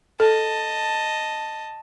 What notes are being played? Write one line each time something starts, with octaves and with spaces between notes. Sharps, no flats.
A4 D#5 A5